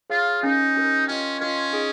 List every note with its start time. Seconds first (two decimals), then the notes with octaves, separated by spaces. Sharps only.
0.10 F4 G#4 C#5 F5
0.42 C#4 D#4 G4 A#4
0.75 C#4 G4 A#4
1.07 C#4 F4 A#4 D#5 G5
1.40 C#4 F4 A#4 D#5 G5
1.71 D#4 G#4 D#5